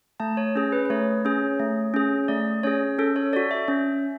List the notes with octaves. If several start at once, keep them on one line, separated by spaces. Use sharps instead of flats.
A3 A5
C#5
C#4 G#4
B4
B4
A3 C#5
C#4 G#4
A3
C#4 G#4
A3 D5
C#4 G#4 C#5
C#4 A4
C#5
F#4 A4 D5
E5
C#4